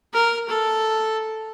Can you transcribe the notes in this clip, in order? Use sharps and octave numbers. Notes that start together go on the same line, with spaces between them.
A#4
A4